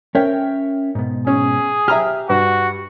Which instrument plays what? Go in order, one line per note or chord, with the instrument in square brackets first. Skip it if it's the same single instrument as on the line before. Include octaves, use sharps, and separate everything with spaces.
[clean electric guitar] C#4 E5 [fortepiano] A#4 C#5 G5
[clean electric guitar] G#2 B2
[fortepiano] C#4 [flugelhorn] G#4
[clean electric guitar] G4 [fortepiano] E5 A#5 F6
[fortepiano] G2 [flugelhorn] F#4